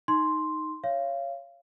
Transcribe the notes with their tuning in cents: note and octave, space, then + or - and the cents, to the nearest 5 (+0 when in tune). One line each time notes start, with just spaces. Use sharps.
D#4 +0 C6 +0
C#5 +0 F5 -25